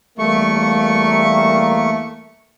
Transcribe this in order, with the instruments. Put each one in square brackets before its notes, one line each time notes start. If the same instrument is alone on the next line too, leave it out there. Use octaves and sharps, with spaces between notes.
[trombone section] E2 G3 A#3 [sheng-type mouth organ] A3 C#6